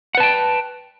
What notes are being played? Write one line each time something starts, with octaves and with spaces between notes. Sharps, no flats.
B4 F#5 G5 A5